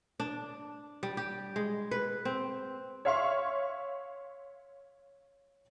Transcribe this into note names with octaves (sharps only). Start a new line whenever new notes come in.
D4
G3
G4
G#3
B4
C4
C#5 E5 F5 C6 C#6